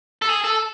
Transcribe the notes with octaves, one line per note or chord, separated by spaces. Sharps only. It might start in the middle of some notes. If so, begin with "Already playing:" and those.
A4
G#4
A4